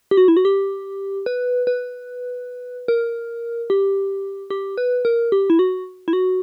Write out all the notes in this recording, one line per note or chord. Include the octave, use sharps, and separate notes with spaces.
G4
F#4
E4
F#4
G4
B4
B4
A#4
G4
G4
B4
A#4
G4
E4
F#4
E4
F#4